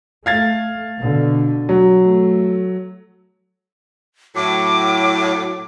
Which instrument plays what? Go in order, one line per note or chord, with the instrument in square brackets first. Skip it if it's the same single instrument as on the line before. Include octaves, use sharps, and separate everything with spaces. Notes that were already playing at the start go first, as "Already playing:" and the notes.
[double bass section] A3 [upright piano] F5 G#6 A6
[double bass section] B2 D3
[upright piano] F#3
[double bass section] A3
[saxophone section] A2 F#3 [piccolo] D6